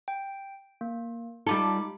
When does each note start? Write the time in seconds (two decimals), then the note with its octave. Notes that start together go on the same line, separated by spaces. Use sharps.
0.08 G5
0.81 A#3
1.47 G3 D#4 F4 A4 B5 D6